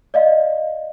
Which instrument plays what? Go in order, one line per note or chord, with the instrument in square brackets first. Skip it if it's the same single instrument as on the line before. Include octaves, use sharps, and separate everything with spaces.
[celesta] D5 D#5 F5